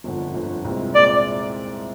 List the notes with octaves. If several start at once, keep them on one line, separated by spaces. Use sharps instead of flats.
G1 F2 D3
G1 F2 D3
C2 A#2 G#3 C4
A#2 G#3 C4 D5